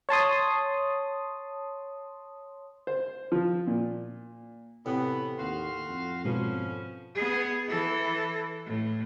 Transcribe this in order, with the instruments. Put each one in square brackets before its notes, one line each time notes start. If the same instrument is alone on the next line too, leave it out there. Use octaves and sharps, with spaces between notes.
[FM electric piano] C#5 A5 C6 D#6
[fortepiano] C5
F3
A#2
[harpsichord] A2 [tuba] C3 [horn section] E3 B3
[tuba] D#2 [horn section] F#4 F5 C6
[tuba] F2
[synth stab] G#2 B2 [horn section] F3 B3 C#4
[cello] B3 G#4
E3 A4
A2